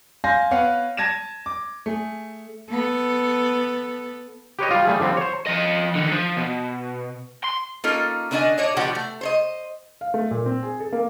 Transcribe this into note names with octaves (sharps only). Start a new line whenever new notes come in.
F5 G#5 C6 G6 A#6
B3 B4 C#5 F5 F#5
A5 G#6 A#6 D#7 E7
D6
A3 G#4
B3 A4
G4 B4 C#5 D#5
G3 F4
G3 A3 G#4
D3 F3 G3 C4
C5 C#5
F3 D#5
D3 D#3
F3
B2
C6
A#3 C#4 D#4 F4 A4
D3 B3 C#4 D4 D#5 G#5
D4 C#5 D#5
B2 D3 F3 G4 F#5 G5
A3
C5 C#5 D#5
F5
A3
A#2
C4
G#4
A4
A#3